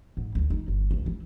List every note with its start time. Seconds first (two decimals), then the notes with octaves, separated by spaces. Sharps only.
0.17 G#2
0.35 D2
0.50 D#4
0.68 G1
0.91 C#2
1.06 E3